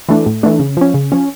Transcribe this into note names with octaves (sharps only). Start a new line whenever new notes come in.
E3 A3 D4
A2
E3 A3 D4
C#3
F3 C#4
C#3
F3 C#4